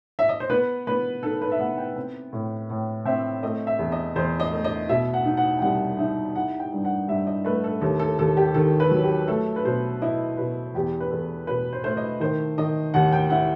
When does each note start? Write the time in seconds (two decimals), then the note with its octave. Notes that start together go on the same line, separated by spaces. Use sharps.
0.19 E5
0.29 D#5
0.40 C5
0.50 B3 B4
0.87 B3 B4
1.23 D#4 A4
1.42 B4
1.52 E5
1.59 B3 F#5
1.78 G5
1.96 C4
2.33 A2
2.70 A2
3.06 C4 E5
3.43 A3 D#5
3.67 E5
3.79 E2
3.92 D#5
4.16 E2 C5
4.40 D#5
4.52 A3
4.65 D#5
4.89 B2 E5
5.14 F#5
5.25 D#4
5.37 F#5
5.59 G5
5.62 C2 F#5
5.99 D#4 E5
6.35 E4 F#5
6.60 G5
6.73 G2
6.85 F#5
7.08 G2 E5
7.27 D#5
7.45 A3 B4
7.64 A4
7.81 D#2 A4
7.99 A4
8.19 D#2 A4
8.37 G4
8.54 D#3 A4
8.80 B4
8.91 F#3
9.03 G4
9.28 A3 A4
9.56 B4
9.65 B2 C5
10.02 E4 D#5
10.37 B2 B4
10.75 E2 G4
11.00 B4
11.10 E2 A4
11.47 B2 B4
11.73 C5
11.84 A3 C5
11.97 D#5
12.20 D#3 C5
12.58 D#3 D#5
12.94 D#2 F#5
13.12 G5
13.30 E4 F#5